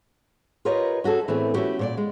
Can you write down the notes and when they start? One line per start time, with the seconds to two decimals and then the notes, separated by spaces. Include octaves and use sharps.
0.65 F4 G4 A#4 B4 C#5 D#5
1.04 C#4 F#4 G#4 A4
1.28 A2 E3 A3 B3 C4 G#4
1.54 A3 C#4 E4 F#4 G4
1.79 A#2 C#5 D5
1.97 G#3